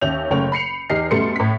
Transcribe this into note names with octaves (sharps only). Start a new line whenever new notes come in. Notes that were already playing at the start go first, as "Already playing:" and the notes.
D#2 C#4 E5 G6 F7
F#1 F#2 A3 C#5 G5 F7
B5 C7 C#7 F7
E2 D#4 G4 F6 C7
F#2 B2 G3 A3 C6 C#7
A2 B6